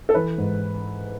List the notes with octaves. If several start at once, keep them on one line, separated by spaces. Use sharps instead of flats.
A4
E3 B4
G#2